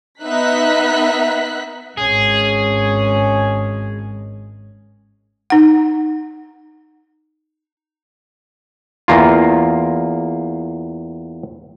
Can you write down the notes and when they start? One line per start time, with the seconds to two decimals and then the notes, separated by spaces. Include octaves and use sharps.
0.23 B3 D#4 E5 F#6 B6
1.98 G#1 G#3 C#4 G#4
5.50 D#4 F#5
9.08 E2 A#3 F4